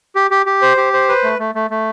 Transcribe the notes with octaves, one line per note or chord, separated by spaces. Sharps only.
G4
G4
G4
C5
G4
C5
B4
A3
A3
A3
A3